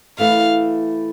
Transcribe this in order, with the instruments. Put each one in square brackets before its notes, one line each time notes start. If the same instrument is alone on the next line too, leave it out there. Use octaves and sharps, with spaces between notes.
[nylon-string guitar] E3 A3 E4 B4 [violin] F5